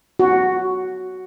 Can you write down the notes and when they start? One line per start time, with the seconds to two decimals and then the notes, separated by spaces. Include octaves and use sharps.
0.19 F#4